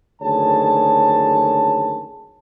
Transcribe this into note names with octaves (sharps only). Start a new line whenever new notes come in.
F#1 D2 D#3 G#4 C#5 A5